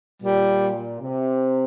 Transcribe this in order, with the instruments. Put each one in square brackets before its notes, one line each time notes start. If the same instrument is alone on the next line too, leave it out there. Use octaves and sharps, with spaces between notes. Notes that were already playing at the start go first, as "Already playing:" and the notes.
[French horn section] A#2 [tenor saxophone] G3
[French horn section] C3